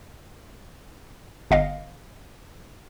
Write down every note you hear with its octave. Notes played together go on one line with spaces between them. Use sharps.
G1 D#5 F5